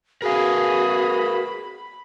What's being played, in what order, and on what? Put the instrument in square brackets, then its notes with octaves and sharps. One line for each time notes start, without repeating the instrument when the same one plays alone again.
[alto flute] F#4 [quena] G#4 [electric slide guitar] A#4 B4 F5 [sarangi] B5